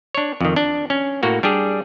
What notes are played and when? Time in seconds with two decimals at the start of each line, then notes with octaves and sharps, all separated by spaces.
0.15 D4 C#5
0.41 F2 D#3
0.56 D4
0.90 C#4
1.23 A2 A#3 F#4
1.43 G3 D4 G4 G#4